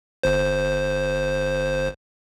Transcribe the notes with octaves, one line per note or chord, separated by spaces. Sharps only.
G1 C5